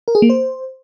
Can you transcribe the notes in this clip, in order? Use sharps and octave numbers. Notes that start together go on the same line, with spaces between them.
A#4
G#4
A#3
C5